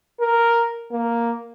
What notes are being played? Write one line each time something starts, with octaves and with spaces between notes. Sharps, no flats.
A#4
A#3